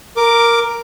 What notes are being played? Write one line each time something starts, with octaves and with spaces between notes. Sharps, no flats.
A#4 D6